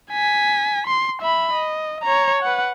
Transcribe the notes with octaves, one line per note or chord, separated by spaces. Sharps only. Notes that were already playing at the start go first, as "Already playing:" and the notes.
G#5 B6
C6
E5 B5
D#5
C#5 A#5
B4 F#5